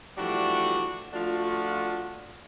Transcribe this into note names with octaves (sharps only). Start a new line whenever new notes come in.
E3 F3 G3 A3 D4 F#4
F3 A3 D4 F4 F#4